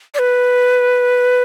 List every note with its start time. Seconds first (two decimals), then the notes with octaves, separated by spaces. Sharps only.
0.14 D5
0.19 B4